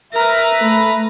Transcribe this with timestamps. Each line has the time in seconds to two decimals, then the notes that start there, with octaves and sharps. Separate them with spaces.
0.13 A#4 B4 E5 A#5
0.61 A3 B5